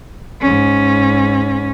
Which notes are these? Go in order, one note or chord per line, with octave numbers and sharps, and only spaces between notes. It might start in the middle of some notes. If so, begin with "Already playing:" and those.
G#2 C#4